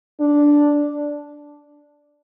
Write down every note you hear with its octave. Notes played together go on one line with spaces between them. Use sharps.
D4